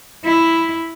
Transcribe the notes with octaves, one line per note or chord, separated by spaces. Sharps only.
E4